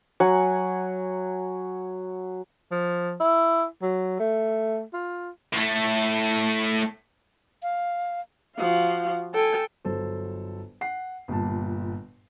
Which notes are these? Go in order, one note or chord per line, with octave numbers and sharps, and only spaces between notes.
F#3 F#5 G#5
F3
E4
F#3
A3
F4
A2 A3
F5
F3 F#4 F5
A4 G5 G#5
G1 F#3 A4 C5
F#5 C7
G1 A#2 G3 A5